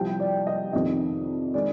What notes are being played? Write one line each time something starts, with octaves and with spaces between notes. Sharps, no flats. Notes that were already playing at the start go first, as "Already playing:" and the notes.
Already playing: C2 C3 F3 G5
D5
D#5
F2 C3 D#3 D#5
D#3 G#3 D5